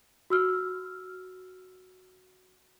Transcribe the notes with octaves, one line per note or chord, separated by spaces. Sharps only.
F#4 E6 F6